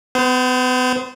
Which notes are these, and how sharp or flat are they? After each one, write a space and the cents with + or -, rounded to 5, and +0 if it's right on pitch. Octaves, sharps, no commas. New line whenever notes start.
B3 +35 C5 -15